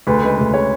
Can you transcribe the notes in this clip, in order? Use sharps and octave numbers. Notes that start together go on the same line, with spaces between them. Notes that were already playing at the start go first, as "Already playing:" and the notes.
D2 B4
C#3 G#3 B4
D2
C#3 G#3 C#5